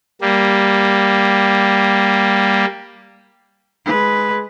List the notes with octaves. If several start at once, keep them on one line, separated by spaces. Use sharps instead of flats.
G3 A#3
G#3 B4